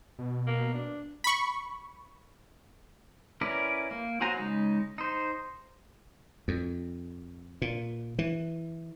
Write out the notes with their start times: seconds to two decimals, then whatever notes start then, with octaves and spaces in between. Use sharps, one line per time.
0.19 B2
0.47 A#3
0.74 D4
1.24 B5 C#6
3.41 C#4 E4 A#4 B4 D5
3.91 A#3
4.21 F#3 F#4 C5 G#5 A#5
4.37 C#3 G#3 D#4
4.98 D#4 C5
6.48 F2
7.62 A#2
8.19 E3